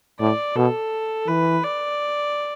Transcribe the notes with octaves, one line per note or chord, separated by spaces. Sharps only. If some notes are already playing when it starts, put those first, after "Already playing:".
A2 D5
B2 A4
E3 B4
D5